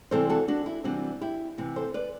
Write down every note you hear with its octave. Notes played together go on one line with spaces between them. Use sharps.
C3 E3 G3 C4 A4 C5
F#4 A4
D4 F#4
E4
C3 E3 G3 C4 D4 F#4
E4 G4
C3 E3 B3
A4 C5
B4 D5